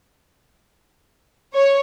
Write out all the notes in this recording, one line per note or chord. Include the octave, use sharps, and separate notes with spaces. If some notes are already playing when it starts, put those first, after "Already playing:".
C#5